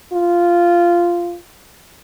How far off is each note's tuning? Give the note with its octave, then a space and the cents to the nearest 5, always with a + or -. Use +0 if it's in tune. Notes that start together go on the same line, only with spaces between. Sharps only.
F4 -10